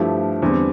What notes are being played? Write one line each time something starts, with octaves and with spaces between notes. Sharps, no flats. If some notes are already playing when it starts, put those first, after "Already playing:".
Already playing: G2 F3 A3 E4 G4
E2 D3 G3 C4